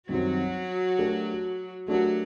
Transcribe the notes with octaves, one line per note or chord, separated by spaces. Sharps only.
F#2 D#3 F#3 G3 C4 F#4
A3 D4 G4 A#4
F#3 A3 D4 F#4 G4 A#4